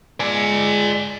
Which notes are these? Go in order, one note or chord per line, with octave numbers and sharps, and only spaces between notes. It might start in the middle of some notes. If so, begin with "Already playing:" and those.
G#3 D5 G#5